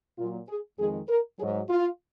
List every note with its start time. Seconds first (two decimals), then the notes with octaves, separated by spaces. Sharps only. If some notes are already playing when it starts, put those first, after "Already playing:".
0.18 A#2 F#3 F4
0.48 G#4
0.78 F2 D#3 G#3 G#4
1.09 A#4
1.39 F#3 G#4
1.43 G#2
1.69 F4